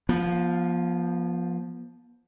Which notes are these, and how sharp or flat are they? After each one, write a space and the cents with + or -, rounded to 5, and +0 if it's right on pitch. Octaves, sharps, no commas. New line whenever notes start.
F3 +0 B3 -45